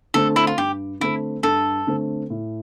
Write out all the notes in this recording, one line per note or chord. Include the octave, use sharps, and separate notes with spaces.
D3 A3 C4 A4
E4
F4
G2 G4
D3 A3 C4 E4
G2 A4
D3 A3 C4
A2